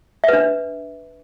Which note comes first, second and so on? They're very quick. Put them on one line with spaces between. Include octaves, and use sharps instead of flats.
E5 B4 D4